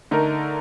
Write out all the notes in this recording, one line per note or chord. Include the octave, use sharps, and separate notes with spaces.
D3 A3 D#4 A#4